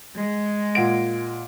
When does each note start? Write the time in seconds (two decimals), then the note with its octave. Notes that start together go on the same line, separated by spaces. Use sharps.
0.16 G#3
0.75 A#2 F#5 D7